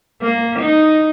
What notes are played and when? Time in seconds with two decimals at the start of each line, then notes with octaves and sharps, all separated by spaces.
0.22 A#3
0.59 D#4